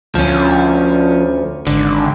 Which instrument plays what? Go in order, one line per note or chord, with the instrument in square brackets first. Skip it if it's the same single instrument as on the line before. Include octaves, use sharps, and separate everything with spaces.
[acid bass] D2 [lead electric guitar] F3 C#4
[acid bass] G#1 [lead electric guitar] D3